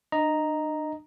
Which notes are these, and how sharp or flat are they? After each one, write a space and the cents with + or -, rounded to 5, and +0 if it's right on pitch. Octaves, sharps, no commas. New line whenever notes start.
D4 +40 D#5 +0 A#5 +0